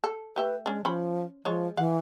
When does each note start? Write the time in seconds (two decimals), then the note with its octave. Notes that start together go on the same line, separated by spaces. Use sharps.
0.04 A4
0.36 A3 G4 B4 E5
0.66 G#3 C#4 D4
0.85 F3 C#4 C5 B5
1.45 F3 G#3 F4 C#5
1.77 E3 F5 F#5